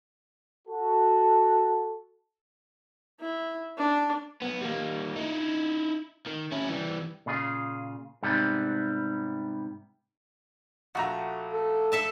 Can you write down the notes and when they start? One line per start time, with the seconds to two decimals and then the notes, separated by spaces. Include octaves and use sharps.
0.68 F#4 A4
3.20 E4
3.78 D4
4.42 B1 B3
4.62 G3 A#3
5.16 D#4 E4
6.26 D#3
6.51 C#4 E4
6.68 E3 G3
7.26 A#2 C#3 F4 G#4
8.23 G#2 C3 G3 B3
10.95 A#1 A3 F#4 A#5
11.53 A4
11.92 A4 E5 A5